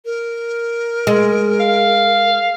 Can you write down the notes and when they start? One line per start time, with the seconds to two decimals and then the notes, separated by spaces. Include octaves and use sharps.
0.05 A#4
1.07 G#3
1.60 F5